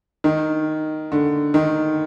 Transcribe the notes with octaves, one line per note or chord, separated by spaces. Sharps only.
D#3
D3
D#3